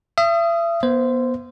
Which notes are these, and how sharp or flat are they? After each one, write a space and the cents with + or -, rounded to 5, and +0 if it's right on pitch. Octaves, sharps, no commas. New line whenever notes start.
E5 +40 D#6 +0
B3 -30 C5 -15